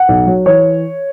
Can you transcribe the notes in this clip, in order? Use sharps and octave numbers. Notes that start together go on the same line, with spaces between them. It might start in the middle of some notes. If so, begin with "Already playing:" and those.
Already playing: F#5
B1
F#3
E3 C#5